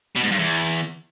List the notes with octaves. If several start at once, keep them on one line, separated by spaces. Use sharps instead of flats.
B2
G#2
G2
E2